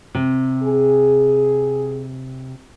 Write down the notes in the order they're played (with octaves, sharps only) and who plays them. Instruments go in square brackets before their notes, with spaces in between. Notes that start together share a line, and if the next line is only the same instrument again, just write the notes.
[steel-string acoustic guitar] C3
[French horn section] G#4